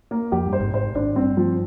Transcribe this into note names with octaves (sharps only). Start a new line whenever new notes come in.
A#3
F2 G4
G2
C5
G#1 G#2
G#1 G#2 C5
G#1 G#2 D4
G2 C4
F3